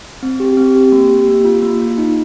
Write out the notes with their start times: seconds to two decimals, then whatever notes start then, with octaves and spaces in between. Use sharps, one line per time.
0.23 C4
0.40 G4
0.57 C4
0.75 G4
0.92 A#3
1.10 G4
1.28 A#3
1.45 F4
1.63 A#3
1.80 F4
1.98 D#4